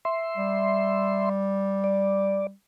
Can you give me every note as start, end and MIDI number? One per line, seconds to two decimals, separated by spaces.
0.05 1.29 76
0.05 1.29 84
0.37 2.52 55
1.84 2.47 74